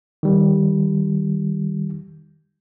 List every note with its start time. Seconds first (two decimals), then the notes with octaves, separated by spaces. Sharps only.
0.23 D#3 G3